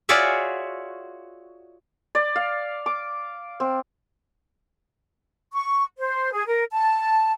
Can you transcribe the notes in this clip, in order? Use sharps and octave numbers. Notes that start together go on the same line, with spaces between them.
F4 F#4 G#4 C#5 D5 E5
D5
F5
D6
C4
C#6
C5
G#4
A#4
A5